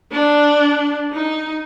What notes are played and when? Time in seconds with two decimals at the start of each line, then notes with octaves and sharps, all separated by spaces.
0.12 D4
1.13 D#4